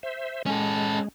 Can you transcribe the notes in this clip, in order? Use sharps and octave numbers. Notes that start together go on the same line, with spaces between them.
C5 E5
G#3 C#4 A4